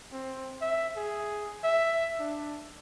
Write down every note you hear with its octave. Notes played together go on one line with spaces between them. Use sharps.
C4
E5
G#4
E5
D4